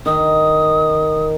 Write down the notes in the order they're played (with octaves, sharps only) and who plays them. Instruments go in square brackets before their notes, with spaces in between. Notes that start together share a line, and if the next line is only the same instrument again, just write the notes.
[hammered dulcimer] D#3 [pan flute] D#6